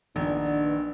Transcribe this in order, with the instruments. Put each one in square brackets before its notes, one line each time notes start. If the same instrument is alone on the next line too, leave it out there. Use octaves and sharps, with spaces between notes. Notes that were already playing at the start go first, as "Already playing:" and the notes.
[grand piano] A#1 [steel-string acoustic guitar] D#3 [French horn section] B3 D4